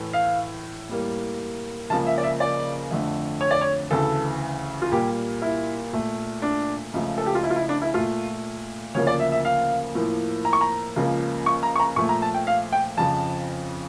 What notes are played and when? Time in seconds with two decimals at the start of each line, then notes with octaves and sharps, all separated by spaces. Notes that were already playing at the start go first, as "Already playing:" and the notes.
Already playing: A2 E3 A3
0.13 F5
0.89 A2 G3 A#3
1.90 C#2 C#3 F3 A#3 A5
2.07 E5
2.18 D5
2.23 E5
2.40 D5
2.91 F2 D3 A3
3.41 C#5
3.51 D5
3.61 C#5
3.91 D2 C#3 E3 A4
4.82 F4
4.92 A#2 G3 A#3 G4
5.42 E4
5.93 A#2 A3
6.42 D4
6.93 C#2 C#3 F3 A3
7.18 A4
7.26 G4
7.35 F4
7.43 E4
7.50 F4
7.56 E4
7.69 D4
7.82 E4
7.94 A#2 A3 F4
8.95 D2 C#3 F3 A#3 C#5
9.07 D5
9.20 E5
9.32 E5
9.45 F5
9.95 A2 F3 A#3
10.45 A#5
10.53 C#6
10.61 A#5
10.96 C#2 C#3 F3 A#3
11.46 C#6
11.63 A#5
11.76 C#6
11.79 A#5
11.96 A#2 F3 A3 C#6
12.09 A#5
12.22 A5
12.34 G5
12.47 F5
12.73 G5
12.97 F2 C#3 F3 A5